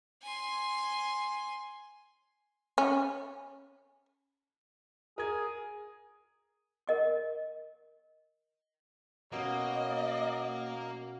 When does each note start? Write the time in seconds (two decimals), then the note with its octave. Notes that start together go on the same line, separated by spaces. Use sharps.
0.23 G#5 C6
2.78 C#4
5.18 G#4 A#4 G#6
6.87 A#4 D#5 C#6
9.32 B2 A#3 C#4 D#5